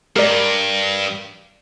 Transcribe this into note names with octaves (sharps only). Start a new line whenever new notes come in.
G2 A#4 D5